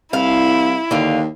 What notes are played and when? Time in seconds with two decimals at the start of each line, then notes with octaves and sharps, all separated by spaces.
0.13 C2 E4 F5
0.91 D#2 D3 F5